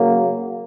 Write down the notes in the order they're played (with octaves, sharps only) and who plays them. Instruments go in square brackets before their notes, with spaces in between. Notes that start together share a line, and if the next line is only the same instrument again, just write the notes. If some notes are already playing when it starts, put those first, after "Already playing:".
Already playing: [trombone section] C#3 F#3 A#3